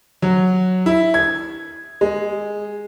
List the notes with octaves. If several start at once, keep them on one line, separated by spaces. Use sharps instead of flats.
F#3
E4
G#6
G#3